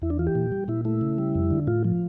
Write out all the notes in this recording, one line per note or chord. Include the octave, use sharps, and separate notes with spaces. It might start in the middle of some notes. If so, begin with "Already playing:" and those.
E2 E4
D4
E3 F4
G4
A#2
G3
A#2 E4
A3 E4
C#3
G3
F2
D3
A2 F4
F3